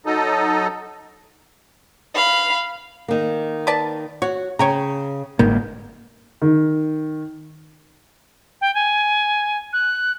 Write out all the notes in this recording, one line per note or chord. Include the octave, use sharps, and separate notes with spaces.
F#3 D#4 A4 D#5
F5 B5
D#3 A#3
B4 D5 A5
F#4 C#5
C#3 C#5 G5 A#5
G1 G#2 D#3 A#3
D#3
G5
G#5
F#6